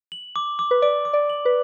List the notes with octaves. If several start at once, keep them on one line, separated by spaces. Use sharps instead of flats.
F#7
D6
D6
B4
D5 D6
D6
D5
F#7
B4